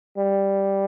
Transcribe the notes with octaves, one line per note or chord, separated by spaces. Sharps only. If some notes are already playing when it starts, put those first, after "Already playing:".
G3